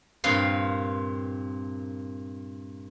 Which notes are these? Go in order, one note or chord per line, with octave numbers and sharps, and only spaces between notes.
G2 A#2 C4 B4 F5 C6